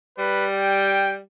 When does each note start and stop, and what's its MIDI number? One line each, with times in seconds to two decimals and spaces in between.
0.18 1.19 55
0.18 0.47 71
0.55 1.15 79